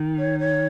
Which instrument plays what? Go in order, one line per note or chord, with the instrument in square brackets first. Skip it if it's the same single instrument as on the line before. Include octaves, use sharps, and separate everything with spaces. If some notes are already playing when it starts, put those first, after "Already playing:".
Already playing: [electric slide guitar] D#3
[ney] C#5
C#5